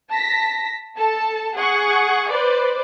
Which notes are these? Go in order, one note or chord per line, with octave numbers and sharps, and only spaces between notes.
A5 A#6 B6
A4 A5
G#4 F#5 C#6
B4 C5 D5